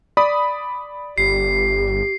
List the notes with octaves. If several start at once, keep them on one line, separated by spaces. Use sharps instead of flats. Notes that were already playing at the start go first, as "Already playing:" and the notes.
D5 B5 D#6
G1 G4 C7